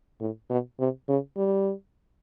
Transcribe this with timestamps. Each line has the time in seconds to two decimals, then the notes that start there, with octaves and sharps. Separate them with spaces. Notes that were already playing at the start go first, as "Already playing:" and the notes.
0.21 A2
0.50 B2
0.79 C3
1.09 C#3
1.37 G3